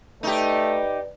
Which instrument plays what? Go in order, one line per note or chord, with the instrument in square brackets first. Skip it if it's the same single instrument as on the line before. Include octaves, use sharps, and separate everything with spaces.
[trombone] A3 [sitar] D#4 G4 [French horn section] B4 D5